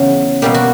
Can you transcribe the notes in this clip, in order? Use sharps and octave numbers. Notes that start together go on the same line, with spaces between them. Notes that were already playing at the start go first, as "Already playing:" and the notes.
Already playing: E2 C#3 F#3
B2 G3 A#3 G4
F#4